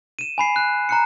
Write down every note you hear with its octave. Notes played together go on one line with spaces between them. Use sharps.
D#7 E7
G#5 B5 C7
F#6
A#5 F#6 C#7